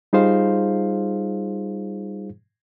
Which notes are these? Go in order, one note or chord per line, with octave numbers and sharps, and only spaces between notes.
G3 D#4 F4 G#4 C5 F5